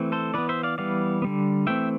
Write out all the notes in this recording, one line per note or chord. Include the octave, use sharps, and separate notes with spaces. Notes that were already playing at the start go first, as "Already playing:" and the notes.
Already playing: E3 A3 C4
A4 C5
E3 B3 B4 D5
C5 E5
D5 F5
E3 G3 B3 D5 F5
D3 G3 B3
E3 A3 C4 E5 G5